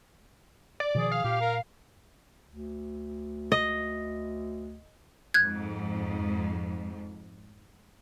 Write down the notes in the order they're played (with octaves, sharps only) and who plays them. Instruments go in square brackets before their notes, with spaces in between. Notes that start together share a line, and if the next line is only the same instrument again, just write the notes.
[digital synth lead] D5
[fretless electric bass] B2 D#3 F3 [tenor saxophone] G#4
[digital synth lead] F5
[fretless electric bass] A#2 [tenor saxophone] G4
[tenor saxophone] A#4
[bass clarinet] D2
[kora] D#5
[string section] F2 G#2 [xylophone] F#6 G#6